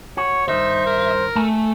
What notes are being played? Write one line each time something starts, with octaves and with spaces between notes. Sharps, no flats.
F#4 C#5
G2 D#3 D#4 C5 E5
A#4
A3 G#5 A5